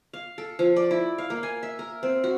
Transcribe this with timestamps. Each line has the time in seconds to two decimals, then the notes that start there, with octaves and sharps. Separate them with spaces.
0.13 F5
0.38 A4
0.59 F3
0.76 D5
0.91 E4
1.18 F5
1.30 A#3
1.43 G#5
1.63 E5
1.79 A#4
2.03 C4
2.24 F#4